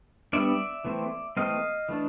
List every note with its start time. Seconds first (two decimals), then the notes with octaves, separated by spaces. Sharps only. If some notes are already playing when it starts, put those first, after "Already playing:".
0.33 G3 B3 D4 D5 E5
0.85 E3 A3 C4
1.37 E3 A3 C4 D#5 F5
1.89 E3 A3 D4